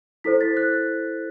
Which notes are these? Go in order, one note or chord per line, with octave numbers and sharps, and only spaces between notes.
E4 A4 C5 B6
A6
F#6